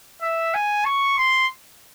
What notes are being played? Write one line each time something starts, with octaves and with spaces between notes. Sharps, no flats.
E5
G#5
C#6
C6